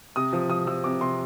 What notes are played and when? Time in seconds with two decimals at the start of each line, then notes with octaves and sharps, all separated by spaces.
0.16 C3 D#6
0.33 F3
0.49 F3 D#6
0.67 F3 E6
0.84 C3 D6
1.01 C3 C6